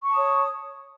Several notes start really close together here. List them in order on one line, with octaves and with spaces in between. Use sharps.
C#6 A5 D#6 C#5